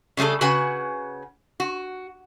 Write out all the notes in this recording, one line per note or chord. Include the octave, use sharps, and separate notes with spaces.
C#3 G3 A3 G#4 A4
C#3 F#4 B4 F#5 G#5
F#4